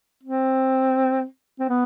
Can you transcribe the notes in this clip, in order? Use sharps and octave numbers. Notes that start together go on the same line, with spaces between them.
C4
C4
B3